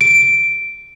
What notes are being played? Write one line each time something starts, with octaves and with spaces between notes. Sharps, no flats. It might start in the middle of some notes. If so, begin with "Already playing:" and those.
D7